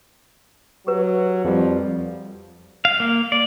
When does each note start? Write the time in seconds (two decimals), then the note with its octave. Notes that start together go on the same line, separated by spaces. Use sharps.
0.87 F#3 G4 B4
1.45 F2 F3 G3
2.85 F5
3.00 A#3
3.32 D5